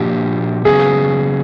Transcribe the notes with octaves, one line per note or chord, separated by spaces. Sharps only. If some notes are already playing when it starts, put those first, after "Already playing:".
Already playing: A#2 F3 A#3 D4 F#4 G4
C#3 F#3 B3 G#4